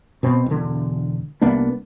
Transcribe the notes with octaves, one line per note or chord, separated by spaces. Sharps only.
B2 C4
E1 D3
C2 A#3 B3 D4